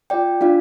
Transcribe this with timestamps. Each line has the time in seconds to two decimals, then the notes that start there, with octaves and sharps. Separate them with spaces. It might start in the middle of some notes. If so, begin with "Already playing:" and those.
0.10 F4 D5 G5
0.41 D4 F4 D5 F5